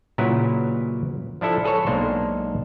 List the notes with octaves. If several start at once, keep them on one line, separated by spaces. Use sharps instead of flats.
A#2 C#3 F#3 E4 A#4 B4
F3 D4 E4 A4
G#4 A4 B4 C#5
B1 G#3 A#3 D4 C5